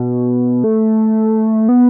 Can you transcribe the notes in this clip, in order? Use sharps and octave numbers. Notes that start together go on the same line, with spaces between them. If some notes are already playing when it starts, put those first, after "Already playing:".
Already playing: B2
A3
B3